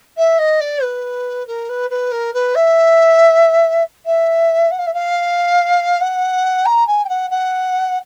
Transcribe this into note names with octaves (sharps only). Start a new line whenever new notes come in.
E5
D#5
D5
B4
A#4
B4
B4
A#4
B4
E5
E5
F#5
F5
E5
F5
F#5
A#5
G#5
G5
F#5
F#5